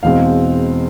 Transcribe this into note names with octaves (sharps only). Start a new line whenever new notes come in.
E2 B2 G#3 C4 F5